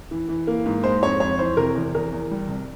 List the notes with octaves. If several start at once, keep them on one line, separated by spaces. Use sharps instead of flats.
E3
E3
A#3
G#2
G#3 C5
F2 C#5
F2 C#5
E3 C5
C3 A#4
E2
E2 A#4
E2
G3
C2